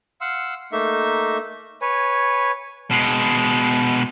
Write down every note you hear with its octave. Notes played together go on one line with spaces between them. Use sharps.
F5 F#5 C6 E6
A3 A#3 D#4 E5
B4 C#5 G#5
B2 G#3